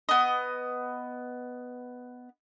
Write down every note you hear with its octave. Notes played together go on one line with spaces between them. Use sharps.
B3 D#5